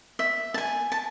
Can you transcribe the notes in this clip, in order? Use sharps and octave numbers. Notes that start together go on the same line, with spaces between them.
E5
A5
G#5
A5